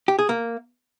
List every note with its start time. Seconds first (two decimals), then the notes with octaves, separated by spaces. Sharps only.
0.08 G4
0.19 G#4
0.29 A#3